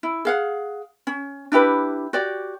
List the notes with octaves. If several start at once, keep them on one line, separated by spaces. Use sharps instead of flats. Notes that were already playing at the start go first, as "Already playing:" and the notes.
E4
G#4 F5 F#5
C#4
D4 E4 G4 B4
F#4 G4 D5